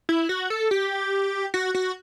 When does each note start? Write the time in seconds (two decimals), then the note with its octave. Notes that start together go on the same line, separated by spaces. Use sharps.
0.09 E4
0.29 F#4
0.50 A4
0.71 G4
1.54 F#4
1.75 F#4